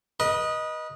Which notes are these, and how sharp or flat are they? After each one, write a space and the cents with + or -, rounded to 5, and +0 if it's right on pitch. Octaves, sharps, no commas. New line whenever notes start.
B4 -35 D#5 +0